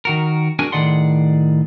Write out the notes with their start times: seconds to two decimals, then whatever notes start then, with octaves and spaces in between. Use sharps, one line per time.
0.05 D#3 F#4 A#4
0.59 D4 F#4 G#4 A#4 G#5
0.72 A2 D#3 G#4 D5 F#5 C6